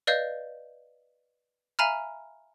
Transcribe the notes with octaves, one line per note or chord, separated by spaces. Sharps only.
B4 D5 D#5 F5 G6
E5 F5 G#5 A#5 B5 F6